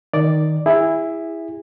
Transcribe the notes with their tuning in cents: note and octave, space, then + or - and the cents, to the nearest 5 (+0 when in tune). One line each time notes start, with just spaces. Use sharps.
D#3 +0 D5 +0
E4 +0 G#4 -30